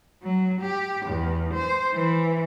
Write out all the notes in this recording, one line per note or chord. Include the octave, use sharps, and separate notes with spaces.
F#3
G4
E2
C5
E3